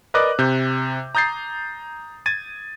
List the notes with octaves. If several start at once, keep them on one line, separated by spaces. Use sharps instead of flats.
A#4 B4 D5 D#5 D6 F#6
C3 G6
A#5 D#6 G6 A6 C7
G#6 A6 D#7